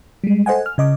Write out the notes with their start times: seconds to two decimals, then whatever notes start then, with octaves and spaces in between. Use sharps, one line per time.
0.24 G3 G#3
0.46 A4 C5 D#5 F#5 G#5
0.66 F6
0.78 C#3 D#5 D6